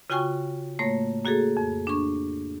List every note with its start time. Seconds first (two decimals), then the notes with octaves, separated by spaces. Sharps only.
0.10 C#3 F4 F#4 G5 G#5 C#6
0.79 A2 A3 A#3 C#5 A#6
1.24 A#3 F#4 G#4 A4
1.57 F2
1.87 D4 C#6